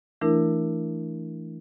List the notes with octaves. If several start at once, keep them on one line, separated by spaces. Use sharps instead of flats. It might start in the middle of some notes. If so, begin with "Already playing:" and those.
E3 A3 D4 E4 A#4